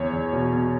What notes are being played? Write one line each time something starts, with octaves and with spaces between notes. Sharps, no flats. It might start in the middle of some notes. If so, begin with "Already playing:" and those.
Already playing: E2 C#5
E2
B2
B2